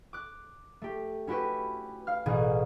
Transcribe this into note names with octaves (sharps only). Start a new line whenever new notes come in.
D6 F#6
A3 G4
C#4 E4 F#4 G4 B4
F5 F6
A1 B2 G#4